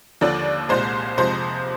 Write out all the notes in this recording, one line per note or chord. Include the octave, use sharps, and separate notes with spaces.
D#2 D3 F3 D5
C2 A#2 G#3 C5
F2 C3 F3 G#3 C5